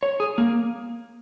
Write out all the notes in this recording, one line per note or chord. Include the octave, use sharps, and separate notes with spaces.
C#5
G#4
A#3